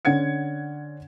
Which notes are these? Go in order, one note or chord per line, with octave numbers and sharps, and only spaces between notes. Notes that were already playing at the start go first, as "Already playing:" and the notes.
D3 C#4 F#5 G#6 C#7